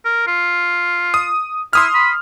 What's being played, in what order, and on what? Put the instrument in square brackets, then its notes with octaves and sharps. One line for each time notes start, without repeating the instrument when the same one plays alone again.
[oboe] A#4
F4
[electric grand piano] D#6
[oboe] E4 [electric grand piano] C6 D#6 F6
[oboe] B5